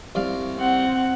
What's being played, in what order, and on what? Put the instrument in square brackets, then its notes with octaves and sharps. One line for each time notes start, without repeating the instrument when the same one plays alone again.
[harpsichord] C2 D5 F5
[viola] C4 F#5